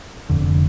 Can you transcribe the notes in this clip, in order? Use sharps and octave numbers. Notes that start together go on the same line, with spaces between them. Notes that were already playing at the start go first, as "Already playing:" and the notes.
F1 F2 D3